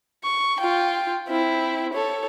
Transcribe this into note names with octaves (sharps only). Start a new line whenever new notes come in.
C#6
F4 G5
C4 E4
A4 C#5